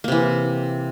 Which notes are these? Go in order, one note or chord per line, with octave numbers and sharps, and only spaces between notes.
C3 E3 A#3